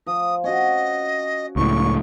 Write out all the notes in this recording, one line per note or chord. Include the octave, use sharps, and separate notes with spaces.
F3 D#6
C#4 F#4 D#5
C#2 A2 C#6